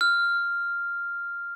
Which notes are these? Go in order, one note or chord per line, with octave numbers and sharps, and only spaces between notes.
F6